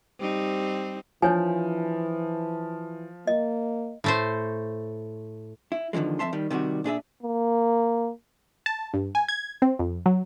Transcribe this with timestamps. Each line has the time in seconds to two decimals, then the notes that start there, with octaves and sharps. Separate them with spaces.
0.19 G3 C4 D#4
1.22 E3 F3 D4 C#5 G#5
3.27 A#3 D#5
4.04 A2 A3 C5
5.72 E4
5.93 E2 D3 D#3 F3 G#3
6.19 F2 A3 E5 A5 C6
6.33 D#3 G3
6.50 C3 D#3 G3 F#4
6.84 A#2 D4 G#4 E5
7.23 A#3
8.66 A5
8.94 G2
9.15 G#5
9.29 G#6
9.62 C4
9.79 F2
10.06 F#3